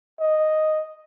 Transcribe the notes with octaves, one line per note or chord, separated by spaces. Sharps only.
D#5